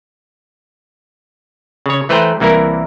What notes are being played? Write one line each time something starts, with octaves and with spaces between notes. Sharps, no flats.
C#3 C#5
E3 A3 B4 C5 G5 A#5
C2 E3 A#3 E4 A#4